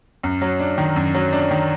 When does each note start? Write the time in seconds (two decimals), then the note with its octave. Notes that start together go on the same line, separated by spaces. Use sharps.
0.23 F#2
0.42 F#3
0.60 D4
0.78 D#3
0.96 F#2
1.14 F#3
1.33 D4
1.51 D#3